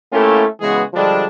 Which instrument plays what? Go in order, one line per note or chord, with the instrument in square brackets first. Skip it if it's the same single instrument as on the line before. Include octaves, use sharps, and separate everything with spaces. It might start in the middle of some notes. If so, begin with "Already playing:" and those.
[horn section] A3 A#3 C#4 E4 F4 G4
C#3 E3 G#3 B3 F#4 G#4
D3 F3 G3 G#3 D4